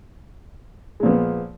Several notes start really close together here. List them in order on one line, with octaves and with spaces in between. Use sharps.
G#3 A#2 F3 B3